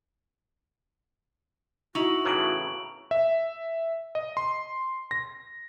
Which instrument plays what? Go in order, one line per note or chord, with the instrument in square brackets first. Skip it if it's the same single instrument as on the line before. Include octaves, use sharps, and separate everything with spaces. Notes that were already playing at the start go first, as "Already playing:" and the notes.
[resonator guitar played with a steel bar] D#4 E4 [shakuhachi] F#4 [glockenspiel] C#6 F7 F#7
[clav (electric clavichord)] A2 C#3 E3 [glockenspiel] A#5 D7 F#7
[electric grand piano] E5
D#5
C6
A#6